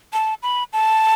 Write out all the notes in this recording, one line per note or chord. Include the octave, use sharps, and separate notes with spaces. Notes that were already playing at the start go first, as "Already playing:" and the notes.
A5
B5
A5